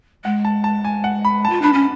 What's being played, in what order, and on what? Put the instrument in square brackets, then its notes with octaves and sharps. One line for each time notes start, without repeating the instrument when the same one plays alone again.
[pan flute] G#3 [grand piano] F#5
[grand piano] A5
A5
G#5
F#5
B5
[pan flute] F4 [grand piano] A5
[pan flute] D4 [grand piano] B5
[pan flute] C#4